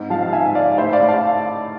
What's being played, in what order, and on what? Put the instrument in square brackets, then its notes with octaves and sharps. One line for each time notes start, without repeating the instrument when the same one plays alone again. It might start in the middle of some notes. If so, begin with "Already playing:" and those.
Already playing: [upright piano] G#2 C4
F3 F5 A5
F5
G#2 E5 G#5
G#2 D5 F5
A2 C5 E5
D5 F5
A2
F5 A5